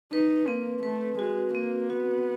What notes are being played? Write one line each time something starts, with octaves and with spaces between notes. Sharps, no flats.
D#4 B4
A#3 C4
A3 B4
G#3 F#4
A#3 C4
B3 F#4